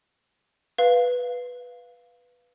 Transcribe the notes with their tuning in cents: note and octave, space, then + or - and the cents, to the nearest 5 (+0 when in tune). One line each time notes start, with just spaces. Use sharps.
B4 +0 F5 +0